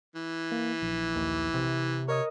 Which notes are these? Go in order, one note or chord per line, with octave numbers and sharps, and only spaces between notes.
E3
A#3
A#1
D#2
C3
A#4 C#5 D#5 D#6